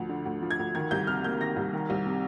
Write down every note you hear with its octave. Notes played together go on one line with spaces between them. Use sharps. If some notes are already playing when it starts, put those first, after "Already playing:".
Already playing: D2 F3
D3
D2
F3
G#6
D2
D#3 G#6
C2 G6
C3 F6
A#3 G6
D#3 A#6
C2
D#3
C2
C3